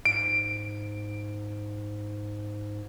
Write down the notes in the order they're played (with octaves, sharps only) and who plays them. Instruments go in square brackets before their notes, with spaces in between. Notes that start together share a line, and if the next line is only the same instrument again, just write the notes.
[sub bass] G#2 [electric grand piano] D7